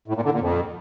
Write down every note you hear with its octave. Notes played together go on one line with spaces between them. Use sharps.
A2
A#2
D3
A#2
F2